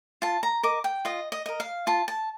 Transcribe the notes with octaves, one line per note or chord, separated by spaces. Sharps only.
F4 A5
A#5
A#4 D#5 D6
G5
F4 D#5
D#5
A#4 D#5
F5
F4 A5
A5